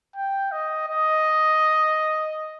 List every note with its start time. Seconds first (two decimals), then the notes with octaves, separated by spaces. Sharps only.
0.16 G5
0.52 D#5
0.88 D#5